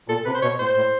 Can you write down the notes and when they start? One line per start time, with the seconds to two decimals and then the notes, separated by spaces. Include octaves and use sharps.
0.08 A#2 A4
0.25 C3 B4
0.35 C5
0.42 B2 C#5
0.59 A2 C5
0.77 A2